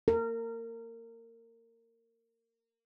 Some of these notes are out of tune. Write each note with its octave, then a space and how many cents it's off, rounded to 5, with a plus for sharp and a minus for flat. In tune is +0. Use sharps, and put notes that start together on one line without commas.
A#4 -25